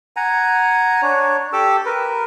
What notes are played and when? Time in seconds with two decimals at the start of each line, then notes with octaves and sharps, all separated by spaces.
0.16 F#5 G#5 A#5
1.02 D4 C#5
1.53 G4 A4 D6 E6
1.86 A#4 B4